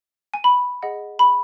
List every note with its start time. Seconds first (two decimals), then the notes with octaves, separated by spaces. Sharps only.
0.34 G#5
0.44 B5
0.83 G#4 D#5 F#5
1.19 B5